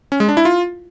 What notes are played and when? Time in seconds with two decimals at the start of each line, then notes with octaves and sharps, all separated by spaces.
0.12 C#4
0.20 G#3
0.29 D4
0.37 E4
0.45 F4